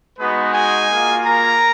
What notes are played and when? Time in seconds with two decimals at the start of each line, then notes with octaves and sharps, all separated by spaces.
0.18 G#3 B3 D#4 F#4 B4
0.54 G#4 G#5
0.90 A#3 F4
1.25 A#4 A#5